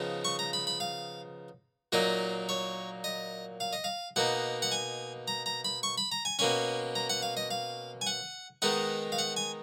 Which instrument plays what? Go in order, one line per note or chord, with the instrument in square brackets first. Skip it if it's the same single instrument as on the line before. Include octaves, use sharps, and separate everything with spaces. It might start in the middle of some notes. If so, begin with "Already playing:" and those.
Already playing: [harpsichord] C#3 F3 B3 D#4
C#6
A#5
B5
B5
F5
A#2 F#3 A#3 D#4 D#5
C#5
D#5
F5
D#5
F5
B2 A#3 D#4 F#5
F#5
G#5
A#5
A#5
B5
C#6
B5
A#5
G#5
B2 A#3 C#4 G#5
A#5
F#5
F5
D#5
F5
G#5
F#5
D#3 G#3 B3 D#4 F#5
F5
F#5
G#5